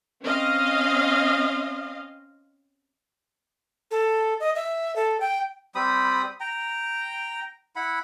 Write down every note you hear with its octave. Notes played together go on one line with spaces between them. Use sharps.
C4 C#4 D#5 F5
A4
D#5
E5
A4
G5
G3 C4 B5 D#6
G5 A#5
E4 F#5 B5